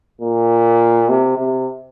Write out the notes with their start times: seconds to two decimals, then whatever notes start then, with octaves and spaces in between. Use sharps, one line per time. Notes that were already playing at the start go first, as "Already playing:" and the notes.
0.21 A#2
1.09 C3
1.38 C3